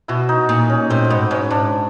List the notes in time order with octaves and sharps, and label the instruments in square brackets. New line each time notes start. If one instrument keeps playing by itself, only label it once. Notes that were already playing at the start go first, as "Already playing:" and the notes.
[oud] B2 [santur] E4 F#4
[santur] D#4
[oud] A#2 [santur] D#4
[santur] C#4
[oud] A2 [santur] C4
[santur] C4
[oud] G#2 [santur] B3
[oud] G#2 [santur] C#4
[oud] G#2 [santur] D4